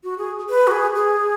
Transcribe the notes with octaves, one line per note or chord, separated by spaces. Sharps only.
F#4
G#4
B4
F#4
G#4
G#4